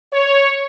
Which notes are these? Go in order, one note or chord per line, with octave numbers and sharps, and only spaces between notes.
C#5